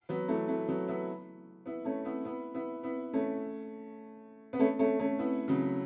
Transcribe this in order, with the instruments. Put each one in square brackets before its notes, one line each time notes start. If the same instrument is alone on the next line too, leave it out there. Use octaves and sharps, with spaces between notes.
[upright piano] F#3 B3
E3 A3
E3 A3
F#3 B3
B3 E4
B3 E4
A3 C#4
B3 E4
B3 E4
B3 E4
B3 E4
A3 C#4
B3
A3 C#4
A3 C#4
A3 C#4
B3 E4
C#3 F#3